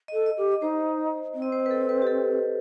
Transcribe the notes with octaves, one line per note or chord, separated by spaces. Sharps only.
D#5
A4
D#5
G4
D#5
D#4 C5
C4
D#5
C5
B4
A4
B4
G4
A4